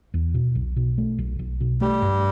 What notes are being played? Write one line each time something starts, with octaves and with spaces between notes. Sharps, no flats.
E2
B2
B1
B2
A3
B1
B1
B2
G3 A3
G2